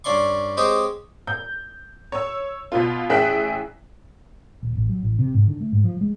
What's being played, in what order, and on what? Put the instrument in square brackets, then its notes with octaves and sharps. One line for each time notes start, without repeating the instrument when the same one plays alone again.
[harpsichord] G2 C#4 D5 C6 C#6
G#3 C4 G4 C5 C#5 D#5
[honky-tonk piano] G6
C#5 E6
B2 B3 F4
A1 G#4 E5 G5 F#6 B6
[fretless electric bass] D#1
A1
F#3
A1
C3
G#2
D3
A3
G#2
F3
G#3